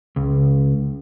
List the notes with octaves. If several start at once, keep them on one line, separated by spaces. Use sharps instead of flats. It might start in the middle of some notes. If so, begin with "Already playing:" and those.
C#2